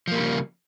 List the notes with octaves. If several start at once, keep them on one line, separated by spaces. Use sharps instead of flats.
C#3 F3 G3 A#3